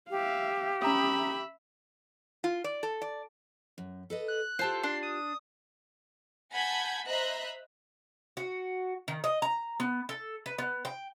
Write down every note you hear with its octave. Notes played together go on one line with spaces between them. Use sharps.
G4 E5 F5
C#4 E5 A#5 B5 D#6
F4
D5
A4
D5
F#2
A4 B4 D#5
F#6
F4 G4 A4 C5
D4 C6
D#6
F#5 G#5 A5 B5 G6 G#6
C5 D#5 E5 A#5 B5 F#6
F#4
D#3
D#5
A#5
B3
A4
B4
B3
G5